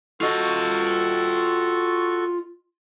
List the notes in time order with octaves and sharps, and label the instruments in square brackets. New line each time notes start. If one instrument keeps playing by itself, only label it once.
[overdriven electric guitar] F4 D#5 [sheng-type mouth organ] F#4 A4 C#6